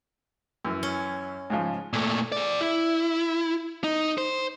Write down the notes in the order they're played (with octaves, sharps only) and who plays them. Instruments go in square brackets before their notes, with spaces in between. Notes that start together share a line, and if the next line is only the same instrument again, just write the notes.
[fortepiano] F#2 E3
[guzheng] C#4
[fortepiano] G#2 C#3 F3
[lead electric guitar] A#2 A3
G#4 D5
E4
D#4
C5